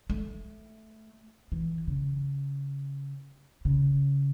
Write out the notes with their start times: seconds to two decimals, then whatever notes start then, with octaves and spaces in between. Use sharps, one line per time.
0.10 A3
1.52 E3
1.88 C#3
3.65 C#3